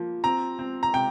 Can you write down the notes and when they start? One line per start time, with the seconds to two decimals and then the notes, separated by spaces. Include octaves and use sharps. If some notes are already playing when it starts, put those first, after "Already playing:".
Already playing: F3 A#3
0.24 C4 A#5
0.59 C4
0.83 A#5
0.94 C3 G5